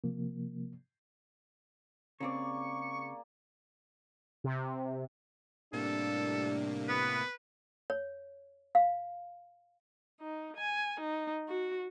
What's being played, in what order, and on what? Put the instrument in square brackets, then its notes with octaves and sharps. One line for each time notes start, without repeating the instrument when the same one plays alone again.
[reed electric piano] C3 F3 A#3
[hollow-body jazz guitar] C#3 C4 [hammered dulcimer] A#3 G#4 D5 [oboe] C#6
[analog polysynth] C3
[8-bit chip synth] A2 C3 A#3 [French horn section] G3 D4 [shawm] A4
[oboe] B3 [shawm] B4
[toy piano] C#5
F5
[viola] D#4
G#5
D#4
F#4